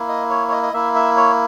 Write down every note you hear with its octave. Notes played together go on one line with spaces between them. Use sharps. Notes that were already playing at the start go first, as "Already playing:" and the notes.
Already playing: A#3 E4
D#5
C#5
C#5
D#5
D#5
A#3 E4 E5
E5
C#5